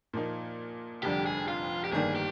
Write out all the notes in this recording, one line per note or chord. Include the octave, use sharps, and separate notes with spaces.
A#2 F3 A#3 D#4
F1 F2 D3 G3 G4
G#4
F4
G4
G1 G2 D#3 G3 A#3 G#4
G4